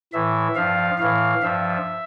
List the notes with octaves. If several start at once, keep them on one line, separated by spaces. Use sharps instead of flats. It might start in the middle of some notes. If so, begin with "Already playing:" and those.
A2 E3 E5
G2 F3 F5
A2 E3 F5
G2 F3 E5